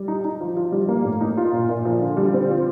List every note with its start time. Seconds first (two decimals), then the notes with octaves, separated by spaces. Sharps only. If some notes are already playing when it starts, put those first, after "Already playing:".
Already playing: G3
0.08 D#4
0.25 D#4
0.41 F3
0.57 F3
0.72 G3
0.89 A#3
1.05 A2
1.21 D#4
1.37 F4
1.52 A#2
1.69 A#2
1.85 F3
2.01 D3
2.17 G3
2.34 C4
2.50 F4